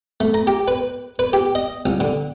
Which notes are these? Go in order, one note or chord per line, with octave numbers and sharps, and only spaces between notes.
A3
A#5
G4
B4
B4
G4
D#5
C2
D3